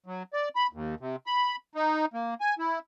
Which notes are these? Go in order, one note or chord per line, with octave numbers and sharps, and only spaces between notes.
F#3
D5
B5
D#2
C3
B5
D#4
A#3
G#5
E4